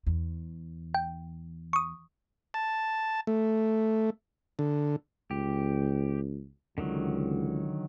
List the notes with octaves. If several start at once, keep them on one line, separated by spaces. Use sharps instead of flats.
E2
G5
C#6 D#6
A5
A3
D3
C#2 G4
C#2 D3 D#3 F#3